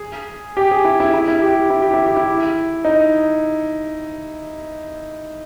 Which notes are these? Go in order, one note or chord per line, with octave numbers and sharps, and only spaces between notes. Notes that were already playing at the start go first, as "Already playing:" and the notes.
Already playing: G#4
G4
G#4
E4
E4
E4
E4
G4
E4
G4
E4
G4
E4
D#4